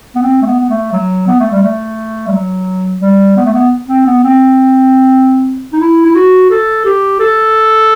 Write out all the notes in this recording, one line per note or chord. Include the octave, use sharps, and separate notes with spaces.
B3
C4
A3
B3
B3
A3
F#3
B3
A3
G3
A3
G3
F#3
G3
B3
A3
B3
C4
B3
C4
D#4
E4
E4
F#4
A4
G4
A4